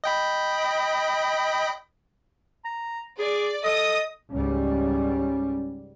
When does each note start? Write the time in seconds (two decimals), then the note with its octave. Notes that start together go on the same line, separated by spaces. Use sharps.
0.04 D#5 G5 B5
2.65 A#5
3.19 G#4 D5
3.64 A4 D#5 D#6
4.31 C#2 G#2 G3 C#4